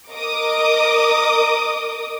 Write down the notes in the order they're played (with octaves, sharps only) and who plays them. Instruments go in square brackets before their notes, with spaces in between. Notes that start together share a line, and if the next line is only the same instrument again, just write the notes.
[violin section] A#4 D#5 D6 D#6